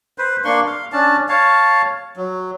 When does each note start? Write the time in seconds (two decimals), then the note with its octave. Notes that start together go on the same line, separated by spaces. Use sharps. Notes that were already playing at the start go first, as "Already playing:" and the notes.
0.18 B4 C5
0.45 A#3 D4 C6 C#6
0.67 F5
0.92 C#4 D4 A5
1.29 C#5 F5 A5
2.16 F#3